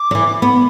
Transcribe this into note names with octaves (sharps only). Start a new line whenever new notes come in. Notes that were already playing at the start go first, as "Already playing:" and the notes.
Already playing: D6
F#3
E3
B3 B5